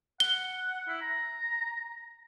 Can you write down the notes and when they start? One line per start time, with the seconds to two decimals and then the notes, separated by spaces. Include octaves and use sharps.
0.20 F#5 G7
0.87 E4
1.01 A#5